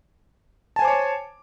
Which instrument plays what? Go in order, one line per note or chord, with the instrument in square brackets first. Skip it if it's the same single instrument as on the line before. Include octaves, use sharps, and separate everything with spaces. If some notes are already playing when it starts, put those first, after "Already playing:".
[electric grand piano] A5
G#5
C5
D6
C#5